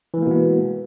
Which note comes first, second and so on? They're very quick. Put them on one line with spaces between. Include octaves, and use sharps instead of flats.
E3 G#3 A#3 B2 B3